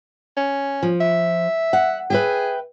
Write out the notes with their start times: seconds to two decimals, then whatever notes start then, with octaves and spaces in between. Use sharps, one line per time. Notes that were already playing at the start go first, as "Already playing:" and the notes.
0.37 C#4
0.83 F3
1.01 E5
1.73 F#5
2.10 G#4 B4 E5 G5